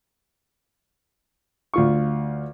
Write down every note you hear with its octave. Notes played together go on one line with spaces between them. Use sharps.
D2 F4 C#6